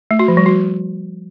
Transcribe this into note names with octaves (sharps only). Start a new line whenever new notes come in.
A3
F#4
F3
G3
F#4